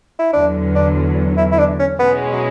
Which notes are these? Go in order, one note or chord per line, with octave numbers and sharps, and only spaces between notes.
E4
E2 D3 F#3 D4
D4
E4
E4
D4
C#4
B2 G#3 B3 C#4 E4
F#3